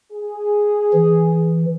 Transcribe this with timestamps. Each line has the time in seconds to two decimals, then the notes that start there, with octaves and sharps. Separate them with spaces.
0.12 G#4
0.93 E3